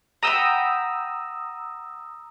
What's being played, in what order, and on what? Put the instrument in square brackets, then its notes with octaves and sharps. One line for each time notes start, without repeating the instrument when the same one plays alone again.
[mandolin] F#5 G5 B5 [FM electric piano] A#5 D#6 E6